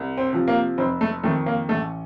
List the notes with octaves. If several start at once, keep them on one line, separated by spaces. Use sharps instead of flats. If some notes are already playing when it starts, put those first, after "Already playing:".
Already playing: C2
C4
C3 F3
A#3
F1 C4
A3
F2 D#3 A3
A#3
A1 A3